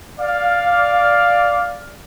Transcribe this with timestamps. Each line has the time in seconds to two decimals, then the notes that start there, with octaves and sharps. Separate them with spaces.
0.20 D5 F5